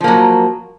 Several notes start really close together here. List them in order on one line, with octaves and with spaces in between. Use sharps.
F3 A#3 F#3